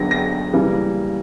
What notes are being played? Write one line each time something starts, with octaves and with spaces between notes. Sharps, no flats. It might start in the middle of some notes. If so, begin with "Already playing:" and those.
Already playing: D3 F#3 B3 A#6
A#6
C#3 E3 G3 A#3